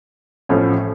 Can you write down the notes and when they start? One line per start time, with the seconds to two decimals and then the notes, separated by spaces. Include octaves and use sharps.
0.49 A1 A2 F3 A3 C#4